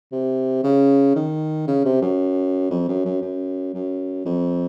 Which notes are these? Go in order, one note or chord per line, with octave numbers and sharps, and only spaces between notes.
C3
C#3
D#3
C#3
C3
F#2
F2
F#2
F#2
F#2
F#2
F2